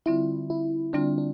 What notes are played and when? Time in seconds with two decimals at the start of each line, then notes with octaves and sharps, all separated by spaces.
0.06 D3 G3 C4 E4 F4
0.50 E4
0.94 D3 G3 C4 D4 F4
1.18 D4